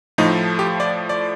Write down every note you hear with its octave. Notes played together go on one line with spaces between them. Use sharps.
A2 F3 A3 D#4
G4
D5
D5